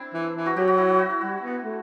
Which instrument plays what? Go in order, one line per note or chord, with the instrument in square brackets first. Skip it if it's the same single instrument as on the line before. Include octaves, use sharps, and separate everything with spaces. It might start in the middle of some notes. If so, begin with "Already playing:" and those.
Already playing: [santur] C4 D4 E4
[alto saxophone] E3
E3
[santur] F#4
[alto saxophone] F#3 [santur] G4
[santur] F#4
E4
F#4
F#4
E4
[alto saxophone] G3 [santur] F#4
[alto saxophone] B3
A3